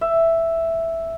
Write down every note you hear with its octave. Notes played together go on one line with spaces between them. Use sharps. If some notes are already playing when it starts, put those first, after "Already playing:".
E5